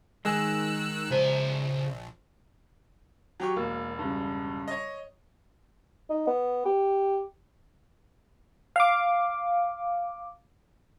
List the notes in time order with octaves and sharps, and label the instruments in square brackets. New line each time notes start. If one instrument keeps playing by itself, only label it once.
[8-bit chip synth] D#3 E6 F#6 [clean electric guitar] G#3 G#4
[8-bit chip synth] A#1 [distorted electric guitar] C#3 A#5 [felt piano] C5
[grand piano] F#3 G4 C#6
[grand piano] E1 [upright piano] A#3
[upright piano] G2 C#3
[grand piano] C#5 D#5
[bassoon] D#4
B3
G4
[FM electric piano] F5 D6